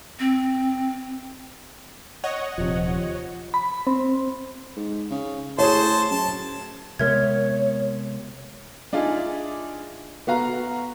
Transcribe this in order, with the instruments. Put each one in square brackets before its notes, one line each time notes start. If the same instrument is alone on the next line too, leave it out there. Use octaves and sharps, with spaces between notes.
[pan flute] C4
[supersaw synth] C#5 D#5 F#5
[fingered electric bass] D#1 C3 [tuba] F3
[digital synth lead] B5
C4
[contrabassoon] G#2
C#3
[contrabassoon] A2 [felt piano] G#4 C#5 [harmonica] C5 A5
[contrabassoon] F#2 [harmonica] A5
[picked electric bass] C3 G#3 B3 [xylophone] A#4 E5 G#6 [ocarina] C#5
[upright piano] D4 D#4 F4 G#4 E5
B3 F#4 F5 A#5